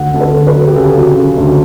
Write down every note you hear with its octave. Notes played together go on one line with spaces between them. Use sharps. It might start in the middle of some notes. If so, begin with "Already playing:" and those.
Already playing: D2 F#5
D2 A4
B4
D2
B4
F#3
G4
C#3 A4
F#3
C#3
D2